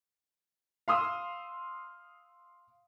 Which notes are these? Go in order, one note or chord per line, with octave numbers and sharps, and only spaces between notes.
F5 C6 D#6 E6